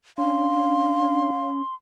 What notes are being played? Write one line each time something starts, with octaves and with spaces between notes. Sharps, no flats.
C#4 D4 F5 C6